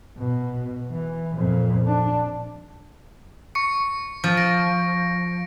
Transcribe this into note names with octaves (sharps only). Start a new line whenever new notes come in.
B2
E3
F2 A#2
D4
C#6 C#7
F3
A#6 D7